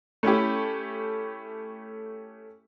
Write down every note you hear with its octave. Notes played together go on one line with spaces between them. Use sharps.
A3 C#4 E4 G4